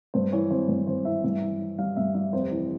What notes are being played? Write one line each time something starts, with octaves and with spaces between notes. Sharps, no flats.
G2 C5
E3 C#5
G#1 C5
G2
G#1 C5
E3 E5
G2 E5
E3
E3
G3 F5
G2 E5
G3 E5
F1 C5
E3